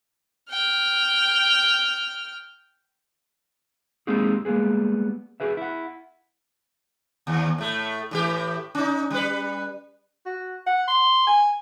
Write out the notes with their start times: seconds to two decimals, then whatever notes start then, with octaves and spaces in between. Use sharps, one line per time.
0.50 G5 F6
4.07 G#3 A#3 C4 D#4 G4 G#4
4.45 G3 G#3 A#3 B3 G#4
5.40 F#4 G#4 B4 E5
5.57 E4 F#5
7.27 D#2
7.58 A2 A3
8.11 A2 E3 G4
8.75 C#4 D#4
9.11 G3 B4
10.26 F#4
10.66 F#5
10.88 C6
11.27 G#5